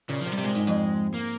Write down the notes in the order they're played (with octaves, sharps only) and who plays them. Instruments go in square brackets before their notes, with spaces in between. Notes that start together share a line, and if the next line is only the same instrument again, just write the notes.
[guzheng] A#2 [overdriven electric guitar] C#3
[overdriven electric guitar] F3
[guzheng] C3
[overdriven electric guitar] G3
[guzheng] C3
[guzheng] A#2 [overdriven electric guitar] G#3
[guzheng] G#2
F2
[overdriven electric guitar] A#3